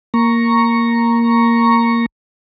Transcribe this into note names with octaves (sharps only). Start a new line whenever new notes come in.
A#3 A#5 C#6